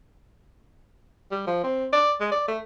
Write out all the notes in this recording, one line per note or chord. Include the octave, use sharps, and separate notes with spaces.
G3
F3
C4
D5
G#3
D5
A3